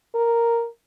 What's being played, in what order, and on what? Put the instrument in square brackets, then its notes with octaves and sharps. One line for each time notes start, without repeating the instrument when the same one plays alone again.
[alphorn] A#4